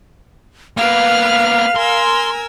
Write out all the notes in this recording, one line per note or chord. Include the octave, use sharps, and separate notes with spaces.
A#3 B3 B4 F5 F6
A#4 G#5 C6 E6